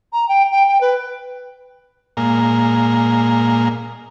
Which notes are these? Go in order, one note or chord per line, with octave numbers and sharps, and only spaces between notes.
A#5
G5
G5
G5
B4
A#2 G#3 A#3